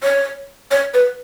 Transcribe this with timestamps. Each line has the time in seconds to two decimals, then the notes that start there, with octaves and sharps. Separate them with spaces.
0.03 C#5
0.71 C#5
0.94 B4